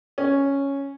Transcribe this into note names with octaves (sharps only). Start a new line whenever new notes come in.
C#4